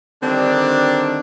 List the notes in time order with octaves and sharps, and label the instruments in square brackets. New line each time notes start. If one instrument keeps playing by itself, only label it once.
[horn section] D3 D#3 G3 C4 D4